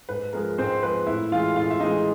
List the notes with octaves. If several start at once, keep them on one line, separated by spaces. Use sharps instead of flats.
G#2 B4
F3 G#3 A#4
G#2 C4 C5
F3 G#3 B4
A2 E4 E5
E3 G#3 F4 F5
A2 F4 F5
E5
E3 G#3 D#4 D#5